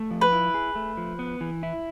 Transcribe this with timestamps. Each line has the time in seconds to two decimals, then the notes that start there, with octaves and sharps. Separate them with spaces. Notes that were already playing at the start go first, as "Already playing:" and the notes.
Already playing: A3
0.11 F3
0.21 B4
0.32 E4
0.54 G#4
0.75 A3
0.97 F3
1.19 B3
1.41 E3
1.63 E4